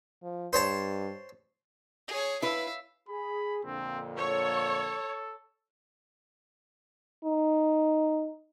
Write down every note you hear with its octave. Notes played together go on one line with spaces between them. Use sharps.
F3
G2 C5 C#5 A5
G#4 C#5
E4 B4 E5 F5
G#4 B5
F2 A#2 D3 C4
A4 C#5
D#4